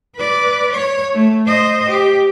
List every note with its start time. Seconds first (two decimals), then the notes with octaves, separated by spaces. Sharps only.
0.15 B4 D5
0.73 C#5
1.13 A3
1.46 C5 D#5
1.89 G4